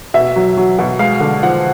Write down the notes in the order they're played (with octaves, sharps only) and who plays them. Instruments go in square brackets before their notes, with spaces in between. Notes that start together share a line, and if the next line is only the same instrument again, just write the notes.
[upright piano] B2 E5
F#3
F#3
B2
G#3 F5
D3
F3 F#5